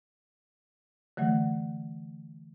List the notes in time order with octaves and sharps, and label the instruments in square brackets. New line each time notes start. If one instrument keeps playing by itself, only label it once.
[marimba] D3 E3 F#3 A3